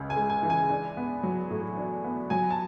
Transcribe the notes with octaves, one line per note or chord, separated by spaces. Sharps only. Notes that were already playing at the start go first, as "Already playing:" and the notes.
Already playing: C#2 C#3
G#5
G#3
G#5
E3
G#5
D4
B3
F#3
A2
D4
B3
F#3 G#5
A5